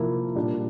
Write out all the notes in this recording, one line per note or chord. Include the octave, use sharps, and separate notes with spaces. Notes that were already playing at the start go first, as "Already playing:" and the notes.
Already playing: C3 F3 A#3 E4
A#2 G3 D4